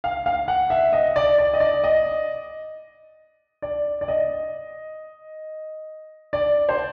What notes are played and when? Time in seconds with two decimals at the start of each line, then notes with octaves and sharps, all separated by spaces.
0.04 F5
0.26 F5
0.48 F#5
0.70 E5
0.93 D#5
1.16 D5
1.38 D5
1.54 D#5
1.60 D5
1.84 D#5
3.62 D5
4.01 D5
4.08 D#5
6.33 D5
6.69 C5